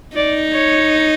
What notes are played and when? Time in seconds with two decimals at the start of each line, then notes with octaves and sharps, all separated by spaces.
0.16 D#4 D5
0.52 C#5